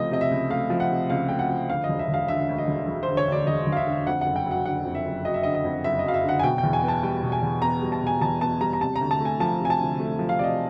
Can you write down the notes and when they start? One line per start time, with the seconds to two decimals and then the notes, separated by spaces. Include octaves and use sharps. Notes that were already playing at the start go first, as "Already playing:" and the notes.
Already playing: C#2 C3 F3 A3 D#5
0.11 C3 D#5
0.21 E5
0.31 C#2
0.50 A3 F5
0.70 F3
0.80 F#5
0.90 C3
1.10 C#2 F5
1.28 A3 G5
1.39 F#5
1.49 F3
1.70 D2 F5
1.84 D#5
1.89 E1
1.99 E5
2.09 E1
2.14 F5
2.28 D3 E5
2.49 D2
2.58 D#5
2.68 E1
2.88 E1
3.03 C5
3.08 D3
3.17 C#5
3.28 D2 D5
3.47 E1 D#5
3.67 E1
3.72 F5
3.77 E5
3.87 D3
4.07 F2 F#5
4.21 F#1 F#5
4.36 G5
4.46 F#3 F#5
4.65 D3 F#5
4.85 F2
4.95 E5
5.05 F#1
5.25 F#3 D#5
5.34 E5
5.43 D3 D#5
5.54 D#5
5.64 F2
5.84 F#1 E5
5.99 D#5
6.04 F#3 F5
6.14 E5
6.24 D3 F#5
6.39 G#5
6.43 B2 G5
6.58 G5
6.63 E2
6.73 G#5
6.83 B3 A5
7.03 G3 G5
7.23 B2
7.32 G#5
7.42 E2
7.62 B3 A#5
7.82 G3
7.92 A5
8.02 B2 G#5
8.21 E2 A5
8.41 B3 A5
8.61 G3 A#5
8.73 A#5
8.81 C3 A5
8.96 A#5
9.01 D2
9.11 A5
9.20 A3
9.25 G#5
9.40 F3 A5
9.60 C3
9.65 G#5
9.70 A5
9.79 D2
9.99 A3
10.19 F3
10.29 F5
10.39 C3 D5
10.44 D#5